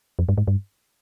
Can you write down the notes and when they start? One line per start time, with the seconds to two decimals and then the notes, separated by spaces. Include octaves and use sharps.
0.19 F2
0.29 G2
0.38 G#2
0.47 G2